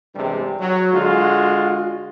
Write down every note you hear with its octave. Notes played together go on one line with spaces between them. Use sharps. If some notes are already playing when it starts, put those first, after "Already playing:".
E2 G2 C3 G3 G#3
F#3
D3 G#3 F4 F#4